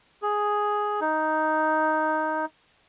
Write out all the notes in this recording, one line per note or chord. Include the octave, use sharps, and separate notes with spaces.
G#4
D#4